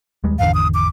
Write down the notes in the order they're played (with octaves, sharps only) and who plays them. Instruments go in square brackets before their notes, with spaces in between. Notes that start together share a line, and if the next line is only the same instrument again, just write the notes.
[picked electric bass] D#2 G3 G#3
[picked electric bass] G#1 E2 D3 [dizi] F5
[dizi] D#6
D6